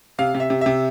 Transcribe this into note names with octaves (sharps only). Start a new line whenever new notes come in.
C3 F5
C3
E5
C3
C3 E5